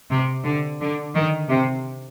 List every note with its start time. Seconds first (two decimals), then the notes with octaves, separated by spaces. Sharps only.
0.10 C3
0.44 D3
0.80 D3
1.14 D#3
1.49 C3